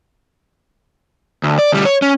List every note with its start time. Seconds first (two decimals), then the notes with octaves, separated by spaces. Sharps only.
1.43 D2
1.59 D5
1.72 D2 G3
1.85 C#5
2.02 C#4